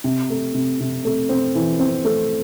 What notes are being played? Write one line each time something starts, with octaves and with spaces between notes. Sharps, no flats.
C3
A3
C3
C3
A3
C4
E3
C4
A3